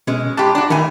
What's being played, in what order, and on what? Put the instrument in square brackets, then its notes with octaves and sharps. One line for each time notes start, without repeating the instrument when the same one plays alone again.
[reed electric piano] B2 [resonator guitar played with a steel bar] G#3 C#4
[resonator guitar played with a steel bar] G#2 G4 [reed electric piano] A5 B5 C6
[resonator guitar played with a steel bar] D4 F#4
[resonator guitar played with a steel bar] A2 E3 G#5 [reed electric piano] D#3 B5